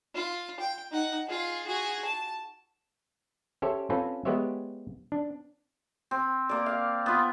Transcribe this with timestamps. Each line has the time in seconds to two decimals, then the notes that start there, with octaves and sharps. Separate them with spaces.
0.15 F4
0.60 G5
0.91 D#4 F#5
1.28 F4 G#4
1.66 F#4 G#4
2.05 A5
3.62 C#4 G4 A4 C5 C#5 E5
3.90 C4 C#4 F4 A4 B4 C5
4.25 G#3 B3 G4 C5 C#5 E5
5.12 D4
6.11 C4
6.49 A#3 D5
6.66 F5
7.06 B3 F4